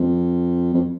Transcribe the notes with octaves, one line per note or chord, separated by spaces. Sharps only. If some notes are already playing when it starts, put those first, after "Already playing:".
Already playing: F2
F2